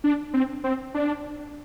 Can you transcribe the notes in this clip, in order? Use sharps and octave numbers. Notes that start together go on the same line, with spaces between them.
D4
C4
C4
D4